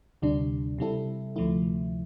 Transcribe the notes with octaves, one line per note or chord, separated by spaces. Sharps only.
D2 C3 G3 D4
C3 G3 C4 E4 A4
D2 C3 F3 A3 E4